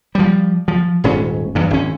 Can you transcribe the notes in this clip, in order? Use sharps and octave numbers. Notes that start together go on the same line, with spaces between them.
F3 G3
F3
D#1 G#2 C#4
E2 G2
G#1 C#4